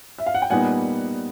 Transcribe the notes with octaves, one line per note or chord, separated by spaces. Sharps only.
E5
F5
F#5
G5
A#2 G3 B3 D#4 F#5 G#5